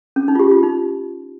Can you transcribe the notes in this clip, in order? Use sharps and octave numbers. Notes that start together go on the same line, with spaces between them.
C#4
D#4
F4
G4
F4
D#4